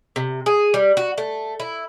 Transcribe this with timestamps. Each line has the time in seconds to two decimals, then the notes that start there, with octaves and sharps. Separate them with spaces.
0.16 C3
0.46 G#4
0.74 G3
0.97 F#4
1.18 A3
1.60 E4